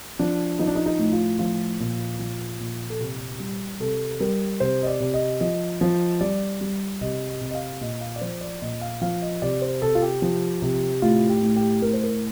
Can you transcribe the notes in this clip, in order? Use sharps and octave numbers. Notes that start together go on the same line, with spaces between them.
F3 D4
F3 D#4
D4
D#4
D#4
A2
F4
F3 F4
A#2
F3
A#2
A4
C3 G4
G3
C3 A4
G3 A#4
C3 C5
D#5
D5
C3
D#5
F3 D#5
F3
G3 D5
G3
C3 D#5
D#5
C3
D#5
F5
A#2 D#5
F5
D5
F3 C5
D5
A#2 D#5
F5
F3 F5
D#5
C3 D5
C5
C3 A4
F4
G4
F3
C3
A2 F4
G4
A2
G4
A2 A#4
C5
A#4